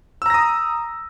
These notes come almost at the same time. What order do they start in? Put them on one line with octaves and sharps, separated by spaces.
E6 A#5 A#6 D#6